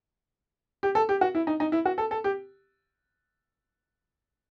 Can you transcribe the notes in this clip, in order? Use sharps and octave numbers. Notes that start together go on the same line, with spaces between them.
G4
A4
G4
F#4
E4
D#4
D#4
E4
F#4
A4
A4
G4